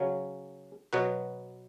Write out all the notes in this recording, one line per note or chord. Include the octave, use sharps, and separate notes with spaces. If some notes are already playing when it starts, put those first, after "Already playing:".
Already playing: C#3 F#3 C#4
B2 F#3 B3 F#4 B4